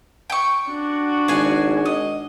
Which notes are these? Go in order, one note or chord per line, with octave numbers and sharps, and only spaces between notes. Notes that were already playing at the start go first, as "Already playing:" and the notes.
G5 C#6
D4 F#4
G#1 G#4 G#5
D#5